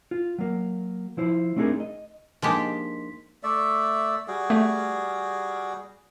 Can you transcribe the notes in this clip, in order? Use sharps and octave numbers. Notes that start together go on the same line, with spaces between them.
F4
F#3 A#3
F3 E4 C5
A3 C4 D4 D#4 G#4 A#4
D#5
F3 G#3 A#3 D4 D#4 G4 C6 B6
A3 D5 E5
G3 F#4 G#4
A3